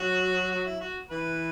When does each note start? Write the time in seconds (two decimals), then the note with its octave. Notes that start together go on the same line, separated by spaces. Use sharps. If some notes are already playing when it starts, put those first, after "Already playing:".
Already playing: F#3 F#4
0.51 F#4
0.66 E4
0.80 F#4
1.10 E3 B4